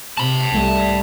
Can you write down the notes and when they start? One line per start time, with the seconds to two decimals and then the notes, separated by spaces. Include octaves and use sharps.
0.17 C3 A5 B5
0.54 C2 G3 A3